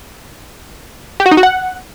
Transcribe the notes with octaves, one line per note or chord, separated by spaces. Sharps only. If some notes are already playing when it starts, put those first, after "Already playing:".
G4
F#4
D#4
F#4
F#5